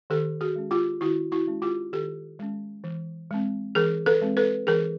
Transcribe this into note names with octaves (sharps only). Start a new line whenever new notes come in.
D#3 G4 A4
F#4 G#4
G#3 C#4
F4 G4
D#3 E4 F#4
E4 F#4
G#3 C#4
F4 G4
D#3 G4 A4
G#3 C#4
E3
G#3 C4
E3 G#4 A#4
A4 B4
G#3 C4
A4 B4
E3 G#4 A#4